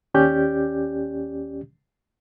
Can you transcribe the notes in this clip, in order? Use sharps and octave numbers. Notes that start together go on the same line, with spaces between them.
D#2 C#4 G4 D5 G6